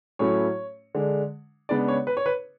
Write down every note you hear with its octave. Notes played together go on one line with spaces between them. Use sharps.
A2 F#3 A3 C#4 E4 C#5
D3 G#3 D4
C#3 G#3 B3 D4 D5
C#5
B4
C#5
B4